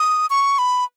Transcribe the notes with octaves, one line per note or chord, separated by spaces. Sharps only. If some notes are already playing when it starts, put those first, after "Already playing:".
Already playing: D#6
C#6
B5